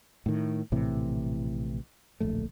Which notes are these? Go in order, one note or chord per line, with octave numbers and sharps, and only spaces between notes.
A2 D#3
A#1 A2 C3 E3
D1 A#1 A3